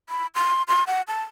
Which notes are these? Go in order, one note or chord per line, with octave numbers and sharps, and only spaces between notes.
B5
C6
C6
F#5
A5